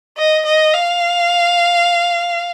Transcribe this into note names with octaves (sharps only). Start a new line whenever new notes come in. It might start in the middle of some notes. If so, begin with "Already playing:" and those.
D#5
D#5
F5